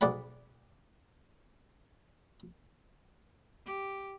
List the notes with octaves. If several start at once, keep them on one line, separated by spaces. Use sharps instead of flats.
B1 G#2 D5 F#5 B5
G4